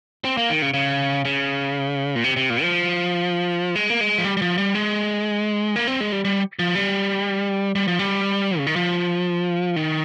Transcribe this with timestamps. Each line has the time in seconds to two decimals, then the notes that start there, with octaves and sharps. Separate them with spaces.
0.25 C4
0.37 A#3
0.50 D#3
0.62 C#3
0.74 C#3
1.25 C#3
2.16 A#2
2.24 C3
2.37 C3
2.50 A#2
2.62 F3
3.75 G#3
3.90 A#3
4.01 G#3
4.18 F3
4.25 G3
4.37 G3
4.42 F3
4.58 G3
4.75 G#3
5.76 A#3
5.87 C4
6.00 G#3
6.12 G3
6.25 G3
6.59 F3
6.75 G3
7.75 G3
7.88 F3
7.99 G3
8.58 C#3
8.67 D#3
8.76 F3
9.76 D#3